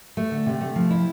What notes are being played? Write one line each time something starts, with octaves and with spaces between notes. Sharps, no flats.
A3
D3
C3
A3
F3
E4